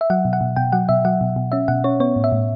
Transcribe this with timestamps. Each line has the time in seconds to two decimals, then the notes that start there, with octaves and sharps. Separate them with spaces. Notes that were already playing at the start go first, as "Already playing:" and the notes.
0.01 E5
0.10 F#3 F#5
0.25 B2
0.33 F#5
0.41 B2
0.56 B2 G5
0.72 F#3 F#5
0.89 B2 E5
1.05 F#3 F#5
1.21 B2
1.36 B2
1.52 C#4 E5
1.68 B2 F#5
1.84 C#4 C#5
2.00 B3 C#5
2.16 A2
2.24 E5
2.32 A2